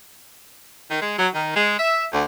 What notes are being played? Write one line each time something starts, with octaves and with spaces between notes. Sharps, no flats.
D#3
G#3
F#3
D#3
G#3
E5
D2